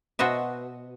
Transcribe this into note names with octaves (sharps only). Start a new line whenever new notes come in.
B2 F#4 C5 D#5 E5